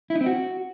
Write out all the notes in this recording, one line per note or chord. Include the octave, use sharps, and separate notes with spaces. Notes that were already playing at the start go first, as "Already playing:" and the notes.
E4
D#4
C4
F#4